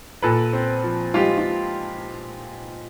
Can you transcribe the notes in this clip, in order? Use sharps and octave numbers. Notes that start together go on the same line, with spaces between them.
A#2 A4 B4
C4
F3
G#3 F4 G4
F4